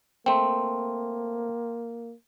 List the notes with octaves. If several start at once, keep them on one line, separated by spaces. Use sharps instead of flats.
A3 A#3 C4 G5 C6